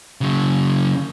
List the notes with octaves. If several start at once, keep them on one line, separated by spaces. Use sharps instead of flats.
C#3 F#3